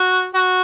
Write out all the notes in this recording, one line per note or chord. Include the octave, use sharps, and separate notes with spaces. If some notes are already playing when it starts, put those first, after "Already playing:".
Already playing: F#4
F#4